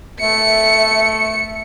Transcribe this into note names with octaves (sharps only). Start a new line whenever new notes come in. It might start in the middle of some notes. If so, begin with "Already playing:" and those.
A3 E5 C#7